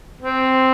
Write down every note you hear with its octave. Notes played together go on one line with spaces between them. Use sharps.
C4